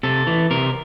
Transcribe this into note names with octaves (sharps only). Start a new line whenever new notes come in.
C3 A4
E3
C3 A#4